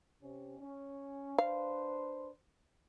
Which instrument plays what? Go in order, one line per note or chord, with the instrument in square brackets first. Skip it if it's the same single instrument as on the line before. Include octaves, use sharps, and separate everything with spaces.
[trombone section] C3 C#4
C#4
[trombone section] D4 B4 C5 [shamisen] F5